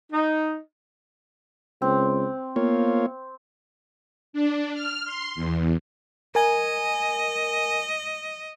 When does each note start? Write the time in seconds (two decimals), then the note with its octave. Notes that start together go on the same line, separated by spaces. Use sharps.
0.11 D#4
1.82 C#2 C4
2.56 A#3 B3 F4 C#5
4.33 D4
4.74 F6
5.05 C6
5.35 E2
6.35 A#4 D#5 G#5